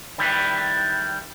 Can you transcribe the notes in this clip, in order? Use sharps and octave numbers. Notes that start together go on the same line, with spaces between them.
D#3 G3 E4 B4